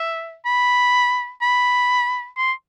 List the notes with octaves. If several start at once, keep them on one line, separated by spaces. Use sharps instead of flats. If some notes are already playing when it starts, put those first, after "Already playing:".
Already playing: E5
B5
B5
C6